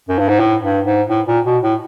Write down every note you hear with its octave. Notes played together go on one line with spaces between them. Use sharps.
F#2
G2
G#2
A2
G2
G#2
A2
A#2
B2
A2